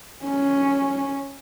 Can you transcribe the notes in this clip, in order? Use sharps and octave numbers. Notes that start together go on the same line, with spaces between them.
C#4